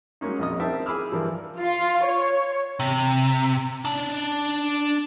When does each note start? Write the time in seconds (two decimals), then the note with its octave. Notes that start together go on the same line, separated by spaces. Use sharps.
0.21 F#3 G#3 A#3 C#4 D#4
0.39 A#1 F2 D#5 D#6
0.60 C4 D#4 A#4 E5 G5 A5
0.86 G#4 B5 D6 E6 F6
1.12 G2 E3 F3 A#4
1.59 F4
2.04 C#5
2.80 C3
3.85 D4 A5